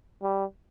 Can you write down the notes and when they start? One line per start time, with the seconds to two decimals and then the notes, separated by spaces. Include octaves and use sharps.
0.23 G3